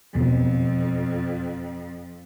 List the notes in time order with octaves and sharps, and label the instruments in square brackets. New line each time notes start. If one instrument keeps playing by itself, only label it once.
[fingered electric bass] E1 B2 [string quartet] F2